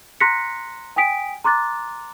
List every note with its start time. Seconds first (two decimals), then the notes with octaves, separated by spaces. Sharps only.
0.20 A#5 C6 F#6 A#6 B6 C#7
0.96 G5 G#5 D#6 B6 D7
1.44 A#5 C6 D6 F#6 A6